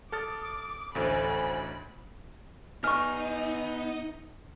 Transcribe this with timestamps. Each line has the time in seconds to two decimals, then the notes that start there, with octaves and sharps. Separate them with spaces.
0.12 A4 D6 D#6 F6 A6
0.95 A1 D2 A2 A4 C5 G#5 B5
2.84 B3 D#4 B4 G#5 C#6 F6